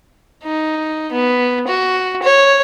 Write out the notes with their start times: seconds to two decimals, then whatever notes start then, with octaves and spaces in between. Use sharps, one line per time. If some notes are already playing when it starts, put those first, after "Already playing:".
0.43 D#4
1.12 B3
1.67 F#4
2.22 C#5